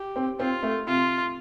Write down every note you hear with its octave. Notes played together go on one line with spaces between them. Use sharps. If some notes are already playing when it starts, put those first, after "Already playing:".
Already playing: G4
C4
C4 F4
A3
C3 F4